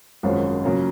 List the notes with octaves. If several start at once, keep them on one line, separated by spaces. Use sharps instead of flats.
G#1 F#2 F3 G#3 C#4 F4
C#3 F#3 A#3 C#4